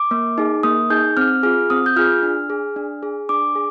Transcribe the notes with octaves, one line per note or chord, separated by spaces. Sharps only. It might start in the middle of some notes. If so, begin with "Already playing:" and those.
Already playing: D6
A#3
D#4 G#4
A#3 D#6
D#4 G#4 G6
C4 F6
F4 G#4 F6
C4 D#6
G6
F4 G#4 F6
D4
G#4
D4
G#4
D4 D6
G#4